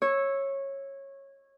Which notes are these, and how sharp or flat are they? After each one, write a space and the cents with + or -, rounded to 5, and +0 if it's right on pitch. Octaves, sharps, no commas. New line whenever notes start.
C#5 -15 E6 +0